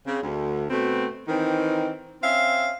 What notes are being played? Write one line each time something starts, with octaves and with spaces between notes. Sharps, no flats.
C#3 C4
D2
B2 A3 B3 C4
D#3 E3 C4 D#4
C4 C#4 E5 F5